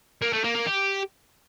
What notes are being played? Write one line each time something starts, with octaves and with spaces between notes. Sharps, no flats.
A#3
A3
A#3
A#3
G4